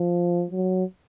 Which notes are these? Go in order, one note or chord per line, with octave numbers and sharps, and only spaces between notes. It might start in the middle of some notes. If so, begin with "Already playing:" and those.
Already playing: F3
F#3